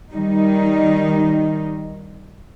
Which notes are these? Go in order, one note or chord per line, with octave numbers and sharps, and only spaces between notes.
D#3 G3 D#4